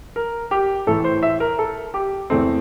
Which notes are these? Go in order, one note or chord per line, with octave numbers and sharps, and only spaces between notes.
A#4
G4
A2 E3 A3 A4
C5
E5
A#4
A4
G4
E2 E3 A3 C4